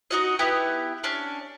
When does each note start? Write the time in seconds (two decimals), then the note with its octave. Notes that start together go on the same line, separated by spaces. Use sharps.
0.11 D#4 F#4 D#5
0.39 B3 E4 G4
1.04 C#4 D4